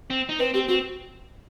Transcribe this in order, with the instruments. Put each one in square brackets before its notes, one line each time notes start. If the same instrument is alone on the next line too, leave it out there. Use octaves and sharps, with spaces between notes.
[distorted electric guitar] C4
D#4
[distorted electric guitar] C4 [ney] B4
[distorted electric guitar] C4 [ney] G4
[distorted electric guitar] C4 [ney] F#4